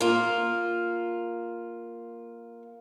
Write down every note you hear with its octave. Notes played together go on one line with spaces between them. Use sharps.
A#3 F4